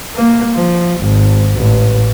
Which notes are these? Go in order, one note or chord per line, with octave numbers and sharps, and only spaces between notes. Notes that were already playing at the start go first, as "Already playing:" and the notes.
A#3
F3
G#1
A1